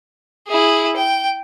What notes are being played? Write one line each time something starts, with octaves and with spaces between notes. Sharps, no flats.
E4 G#4
G5